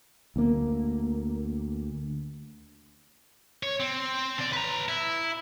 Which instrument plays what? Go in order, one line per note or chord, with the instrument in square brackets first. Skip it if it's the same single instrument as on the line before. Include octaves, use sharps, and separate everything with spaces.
[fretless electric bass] D2 A#3
[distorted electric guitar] C#5
C4
D3 D5
B4 A#5
E4